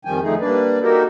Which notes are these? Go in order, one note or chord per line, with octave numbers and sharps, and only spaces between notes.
F2 D#3 F3 G3 G5 G#5
D3 F3 A3 D#4 G#4
G3 A#3 D4 B4 D5
A#3 D#4 F#4 G4 A4 A#4